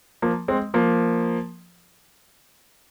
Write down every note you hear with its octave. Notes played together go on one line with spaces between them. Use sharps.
F3 A#3
G#3 C4
F3 A#3